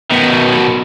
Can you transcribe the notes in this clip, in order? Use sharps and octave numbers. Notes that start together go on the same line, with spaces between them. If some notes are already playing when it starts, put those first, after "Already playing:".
B2 D#3